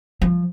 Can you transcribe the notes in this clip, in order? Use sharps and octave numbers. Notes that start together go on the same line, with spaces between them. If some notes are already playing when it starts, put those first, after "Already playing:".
F3